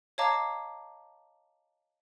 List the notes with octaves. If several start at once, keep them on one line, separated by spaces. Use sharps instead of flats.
C#5 D#5 F5 A5 A#5 D6